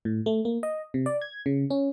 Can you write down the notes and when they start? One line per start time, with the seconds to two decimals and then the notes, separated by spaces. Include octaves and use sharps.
0.05 A2
0.26 A3
0.45 A#3
0.63 D#5
0.94 C3
1.06 D5
1.21 G#6
1.46 C#3
1.70 C#4